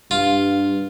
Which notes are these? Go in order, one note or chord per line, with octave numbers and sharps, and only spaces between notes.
G2 F4